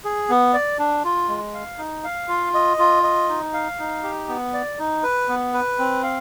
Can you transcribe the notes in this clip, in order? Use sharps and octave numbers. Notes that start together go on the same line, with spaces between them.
G#4
B3
D5
D4
F4
G#3
F5
D#4
F5
F4
D#5
F4
D#5
D#4
F5
D#4
G4
B3
D5
D#4
B4
B3
B4
C4
F5